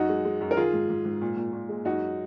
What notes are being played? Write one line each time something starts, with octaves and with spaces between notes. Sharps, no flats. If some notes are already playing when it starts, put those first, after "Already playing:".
Already playing: F#2 D#4 F#4
G#3
G#3
F#2
A#4
D#3 F4 G#4
G#2
G#2
G#2
A#2
A#2
A#2
G#3
F#2 D#4 F#4